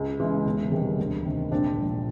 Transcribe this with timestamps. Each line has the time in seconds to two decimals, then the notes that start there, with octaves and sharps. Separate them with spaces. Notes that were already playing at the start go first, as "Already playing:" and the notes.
Already playing: C#2
0.20 C#3 E3 G#3
0.46 E1
0.72 E2 C3 D#3 G3
0.99 D2
1.25 C3 D#3
1.51 A#1 C4 D4
1.77 A#2 F3